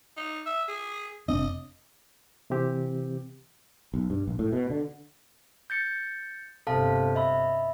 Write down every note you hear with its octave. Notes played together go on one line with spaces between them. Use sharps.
D#4
E5
G#4
F1 C4 D4 D#5
C3 E3 C4 G4
B1
G2
A#1
A2
B2
D3
G6 A6 C#7
G1 C3 A4 F5 A5
D#5 E5 B5